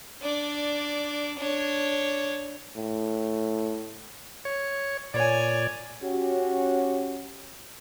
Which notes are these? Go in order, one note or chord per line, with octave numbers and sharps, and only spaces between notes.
D4 D5
D4 C#5
A2
C#5
A#2 C#5 D5 G#5
C#4 F#4 G4